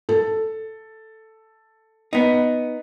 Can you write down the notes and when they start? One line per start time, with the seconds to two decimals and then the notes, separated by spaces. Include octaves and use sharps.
0.09 A4
2.13 B3 D#4